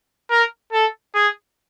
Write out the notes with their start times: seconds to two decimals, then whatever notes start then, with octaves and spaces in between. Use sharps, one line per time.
0.31 A#4
0.73 A4
1.15 G#4